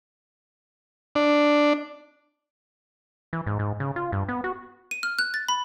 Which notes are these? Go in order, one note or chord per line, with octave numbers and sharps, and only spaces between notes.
D4
E3
G#2
G#2
C#3
F4
G2
B3
F#4
D#7
F6
F#6
A6
B5